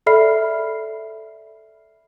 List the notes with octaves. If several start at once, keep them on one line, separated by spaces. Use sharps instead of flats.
A4 D5 E5 B5 F6 C7